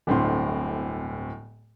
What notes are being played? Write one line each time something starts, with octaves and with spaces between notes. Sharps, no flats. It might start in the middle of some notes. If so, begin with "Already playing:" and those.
D1 G1 A2 D3 C4 C6